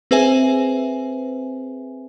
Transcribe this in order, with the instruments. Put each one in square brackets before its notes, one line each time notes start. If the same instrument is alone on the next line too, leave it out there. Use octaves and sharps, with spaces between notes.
[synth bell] C4 G#4 B4 C5 E5 G#5